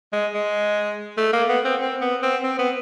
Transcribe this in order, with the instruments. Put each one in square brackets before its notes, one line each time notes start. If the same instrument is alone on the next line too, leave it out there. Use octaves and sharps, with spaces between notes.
[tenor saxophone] G#3
G#3
A3
A#3
B3
C4
C4
B3
C4
C4
B3